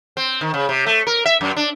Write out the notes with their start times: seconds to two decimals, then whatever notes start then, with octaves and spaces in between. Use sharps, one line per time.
0.17 C4
0.41 D#3
0.54 C#3
0.69 C3
0.86 A3
1.07 A#4
1.25 E5
1.41 F#2
1.57 D4